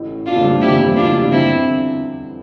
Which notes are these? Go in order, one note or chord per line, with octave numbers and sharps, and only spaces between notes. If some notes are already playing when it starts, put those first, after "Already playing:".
Already playing: A1 A2
D4 F4
F2 F3
G2 G3
F2 F3 E4 G4
E2 E3
F2 F3
G2 G3
D4 F4
E2 E3
G2 G3
F2 F3
E2 E3 C4 E4
D3